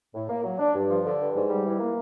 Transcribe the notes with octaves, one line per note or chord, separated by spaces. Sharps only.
A2
A#3
F#3
D4
G2
F3
D3
G2
G#2
G3
E3
A#3